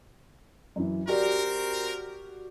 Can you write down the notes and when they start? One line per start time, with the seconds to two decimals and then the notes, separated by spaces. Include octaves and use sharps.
0.76 F#2 E3
1.07 C4 F#4 G4 A#4 D5